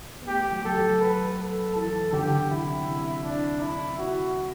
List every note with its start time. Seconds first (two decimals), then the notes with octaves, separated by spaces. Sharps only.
0.20 B3
0.27 A3 G4
0.52 F#3
0.65 A4
0.76 F#3
1.01 B4
1.39 A4
1.75 E3 A4
2.13 D3 G4
2.49 C3 E4
2.87 C3
3.24 D4
3.61 E4
3.98 F#4